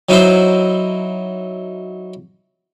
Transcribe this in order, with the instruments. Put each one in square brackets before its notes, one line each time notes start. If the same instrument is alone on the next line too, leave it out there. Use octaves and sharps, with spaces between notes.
[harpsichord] F#3 D#4 E4 C5